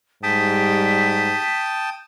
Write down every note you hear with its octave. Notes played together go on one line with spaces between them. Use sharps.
G#2 G3 G5 A5 D#6 B6